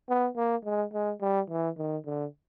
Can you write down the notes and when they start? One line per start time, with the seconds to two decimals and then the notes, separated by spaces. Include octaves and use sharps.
0.09 B3
0.36 A#3
0.64 G#3
0.93 G#3
1.21 G3
1.49 E3
1.77 D#3
2.05 D3